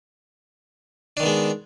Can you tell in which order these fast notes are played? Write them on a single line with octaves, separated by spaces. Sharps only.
D4 D#3 B3 G#3